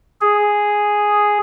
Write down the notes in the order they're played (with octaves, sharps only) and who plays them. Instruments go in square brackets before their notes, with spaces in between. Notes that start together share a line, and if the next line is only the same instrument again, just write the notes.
[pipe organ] G#4